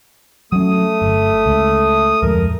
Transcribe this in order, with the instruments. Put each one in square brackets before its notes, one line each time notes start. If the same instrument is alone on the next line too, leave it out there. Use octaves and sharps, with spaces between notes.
[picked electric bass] F#3 C#4 [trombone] A3 [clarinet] D#6
[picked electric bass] G1
C#2
[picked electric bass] D1 F2 G#3 [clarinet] A#4